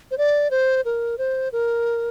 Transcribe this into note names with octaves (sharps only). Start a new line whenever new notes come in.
C5
D5
C5
A#4
C5
A#4